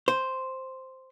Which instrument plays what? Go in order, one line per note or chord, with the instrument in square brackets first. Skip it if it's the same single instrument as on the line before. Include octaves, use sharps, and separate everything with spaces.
[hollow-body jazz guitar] C5